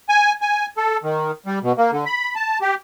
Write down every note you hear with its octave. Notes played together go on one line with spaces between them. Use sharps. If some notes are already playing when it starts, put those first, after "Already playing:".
G#5
G#5
A4
D#3
G3
B2
A#3
D3
B5
A5
G4